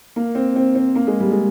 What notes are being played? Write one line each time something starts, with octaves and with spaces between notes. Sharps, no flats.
A#3
C4
C4
C4
A#3
G#3
G3
G#3